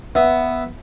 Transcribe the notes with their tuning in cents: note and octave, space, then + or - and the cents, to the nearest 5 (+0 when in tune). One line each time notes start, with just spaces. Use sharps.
B3 +0 E5 +0